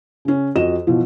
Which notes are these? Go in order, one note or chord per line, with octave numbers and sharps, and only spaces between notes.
C#3 C#4
F2 F#4 D#5 E7
B2 E3 F3